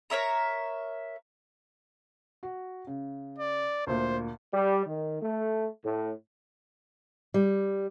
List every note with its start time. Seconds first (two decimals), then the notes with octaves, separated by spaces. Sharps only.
0.10 A#4 C#5 E5 A#5
2.43 F#4
2.87 C#3
3.38 D5
3.87 D2 A#2 C5
4.54 G3
4.86 D#3
5.22 A3
5.85 A2
7.34 G3